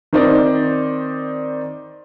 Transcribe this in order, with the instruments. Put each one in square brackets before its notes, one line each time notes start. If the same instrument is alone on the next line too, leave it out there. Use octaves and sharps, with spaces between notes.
[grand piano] D#3 C4 D#4 C5 D5